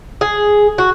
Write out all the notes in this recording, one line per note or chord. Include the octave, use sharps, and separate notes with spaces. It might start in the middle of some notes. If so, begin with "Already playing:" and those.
G#4
F#4